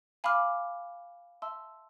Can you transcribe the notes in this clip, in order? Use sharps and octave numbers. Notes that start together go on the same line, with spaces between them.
F5 G#5 B5 D6 F6
E5 A5 C6 E6